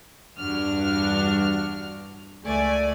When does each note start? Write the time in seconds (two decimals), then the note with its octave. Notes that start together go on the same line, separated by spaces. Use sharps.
0.38 E2 G2 D4 F#4 F6
2.43 C#2 A3 D5 G#5